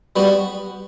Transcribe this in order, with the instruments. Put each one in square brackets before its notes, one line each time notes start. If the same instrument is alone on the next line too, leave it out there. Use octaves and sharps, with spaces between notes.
[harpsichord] G3 B3 F#4